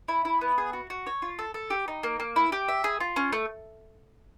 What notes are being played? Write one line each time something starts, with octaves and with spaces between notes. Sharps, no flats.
E4
E4
B3
G#4
F#4
F#4
C#5
F4
A4
A4
G4
D#4
A#3
A#3
E4
G4
E5
G#4
F4
C#4
A3